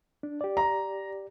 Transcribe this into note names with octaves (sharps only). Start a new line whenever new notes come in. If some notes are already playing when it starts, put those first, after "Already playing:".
D4
G4 D5
A#5